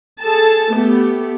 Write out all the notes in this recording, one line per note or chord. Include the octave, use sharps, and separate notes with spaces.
G#4 A4 A5
A3 B3 G4